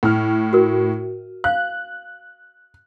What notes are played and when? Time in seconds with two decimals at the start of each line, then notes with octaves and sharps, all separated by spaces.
0.03 A2 F6
0.53 F#4 A#4
1.44 F5 F#6